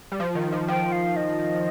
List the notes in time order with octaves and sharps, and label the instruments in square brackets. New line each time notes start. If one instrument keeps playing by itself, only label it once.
[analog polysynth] G3
F3
D#3
F3
[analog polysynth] F3 [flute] G5
[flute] F5
D#5